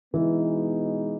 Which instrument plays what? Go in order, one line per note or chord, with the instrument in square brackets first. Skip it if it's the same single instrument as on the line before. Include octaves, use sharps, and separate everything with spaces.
[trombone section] B2 G#3 B3 D#4 [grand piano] E3